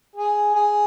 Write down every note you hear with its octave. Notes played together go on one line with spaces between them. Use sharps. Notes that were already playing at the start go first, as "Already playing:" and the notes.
G#4
G#4